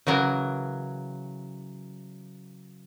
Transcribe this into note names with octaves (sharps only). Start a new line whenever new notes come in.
C#3 E3 F#3 A#4